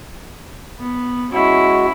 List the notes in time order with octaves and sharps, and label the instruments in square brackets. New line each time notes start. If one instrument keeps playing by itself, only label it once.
[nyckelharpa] B3
[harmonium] G#3 F#4 [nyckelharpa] C#4 E4